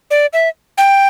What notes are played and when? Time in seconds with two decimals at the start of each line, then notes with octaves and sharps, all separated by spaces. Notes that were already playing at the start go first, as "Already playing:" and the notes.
0.11 D5
0.33 E5
0.78 G5